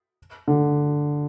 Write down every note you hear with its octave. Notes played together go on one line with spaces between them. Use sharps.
D3